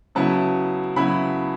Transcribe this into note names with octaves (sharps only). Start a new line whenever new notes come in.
C#3 F#3 B3 E4 A5
C#3 F#3 B3 E4 B5